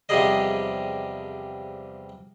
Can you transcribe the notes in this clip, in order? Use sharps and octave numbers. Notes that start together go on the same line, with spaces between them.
E2 C3 F3 G3 G#4 D#5